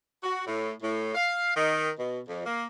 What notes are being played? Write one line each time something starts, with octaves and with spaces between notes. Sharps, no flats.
F#4
A2
A2
F5
D#3
B2
F2
A#3